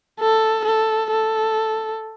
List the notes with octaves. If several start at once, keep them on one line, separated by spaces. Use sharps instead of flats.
A4
A4
A4